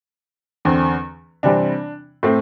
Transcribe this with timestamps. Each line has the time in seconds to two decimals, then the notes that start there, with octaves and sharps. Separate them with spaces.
0.65 E2 D3 C4
1.43 C3 E3 G3 C4 D4
2.23 A2 A3 C4